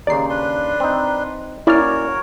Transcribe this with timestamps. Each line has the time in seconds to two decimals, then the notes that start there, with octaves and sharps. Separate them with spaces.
0.07 D#2 C#3 D#4 D5 C7
0.29 D4 B4 C6
0.80 C4 D#4
1.67 A#3 C#4 E4 F#4 A#4 C#5 D5 F6